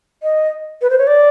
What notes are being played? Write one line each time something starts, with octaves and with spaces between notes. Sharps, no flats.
D#5
B4
C5
C#5
D5